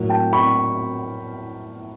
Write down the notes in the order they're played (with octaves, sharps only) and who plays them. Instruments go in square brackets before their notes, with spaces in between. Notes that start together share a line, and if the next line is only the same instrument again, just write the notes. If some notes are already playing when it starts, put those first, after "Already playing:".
Already playing: [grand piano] A2 F#3 A#3
G5 A5
B5 C#6